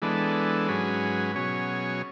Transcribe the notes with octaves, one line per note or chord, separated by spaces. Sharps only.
E3 G#3 B3 D4 A4
G#2 F#3 C#4 G#4 B4
B2 F#3 C#4 G#4 C#5